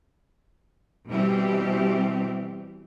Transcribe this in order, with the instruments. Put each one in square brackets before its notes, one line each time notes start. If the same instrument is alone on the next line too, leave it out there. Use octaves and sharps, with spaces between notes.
[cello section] B2 E3 G3 C4 G4